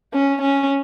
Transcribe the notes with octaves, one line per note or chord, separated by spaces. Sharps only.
C#4
C#4